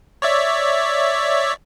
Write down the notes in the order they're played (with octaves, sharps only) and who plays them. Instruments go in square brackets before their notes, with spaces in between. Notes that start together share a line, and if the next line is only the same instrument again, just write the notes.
[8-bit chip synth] C#5 D5 E5